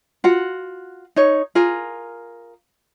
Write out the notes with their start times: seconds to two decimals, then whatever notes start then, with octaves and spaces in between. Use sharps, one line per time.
0.24 F4 F#4 F#5
1.16 D#4 C#5
1.55 F4 G#4 A#4